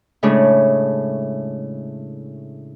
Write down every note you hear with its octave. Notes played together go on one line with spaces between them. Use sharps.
A2 C#3 G#3 A3 D4